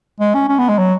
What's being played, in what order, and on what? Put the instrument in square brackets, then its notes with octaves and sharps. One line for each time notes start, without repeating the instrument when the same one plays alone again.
[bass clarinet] G#3
C#4
C#4
B3
G#3
F#3